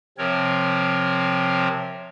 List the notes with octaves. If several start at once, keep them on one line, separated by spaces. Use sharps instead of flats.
C3 F3 C4 A#4 C#5